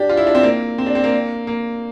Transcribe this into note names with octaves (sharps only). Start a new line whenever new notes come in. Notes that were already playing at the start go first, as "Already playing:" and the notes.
Already playing: D4 G4
F4
E4
D4
C4
A#3
C4
D4
C4
A#3
A#3